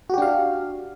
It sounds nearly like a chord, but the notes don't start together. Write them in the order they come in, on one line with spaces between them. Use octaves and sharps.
F#4 G4 D4 F5